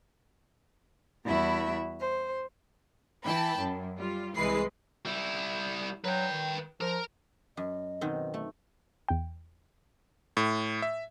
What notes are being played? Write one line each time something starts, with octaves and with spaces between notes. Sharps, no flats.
E2 G3 E4 F#4 E5 B5
C5
E3 G5 A5 B5
F#2
G3 F4
C2 E3 G#3 B4 C7
G3 E4
F#3 B4 G5
D#3
F3 A#4 A#5
F#2 D#5
B2 D#3 C4
A3
E2 G5
A2
E5